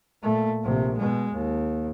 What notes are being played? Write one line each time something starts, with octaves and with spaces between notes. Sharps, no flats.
A#2 A3
A#1 C3
B2 G#3
D#2